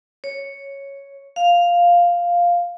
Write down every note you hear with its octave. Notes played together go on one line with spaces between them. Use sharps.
C#5
F5